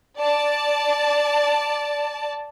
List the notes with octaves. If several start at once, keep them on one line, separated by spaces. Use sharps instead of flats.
D5 A5